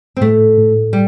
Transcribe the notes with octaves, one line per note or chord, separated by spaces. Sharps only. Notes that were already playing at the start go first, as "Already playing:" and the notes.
C4
A2 A3
A2
G3